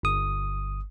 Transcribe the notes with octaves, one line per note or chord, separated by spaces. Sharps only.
G1 D#6